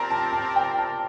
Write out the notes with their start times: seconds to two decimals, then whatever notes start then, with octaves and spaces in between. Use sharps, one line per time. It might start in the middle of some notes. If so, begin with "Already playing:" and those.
Already playing: C4 G4 A#4 D5 A5 A#5
0.10 A5
0.33 A5
0.56 G5
0.79 A5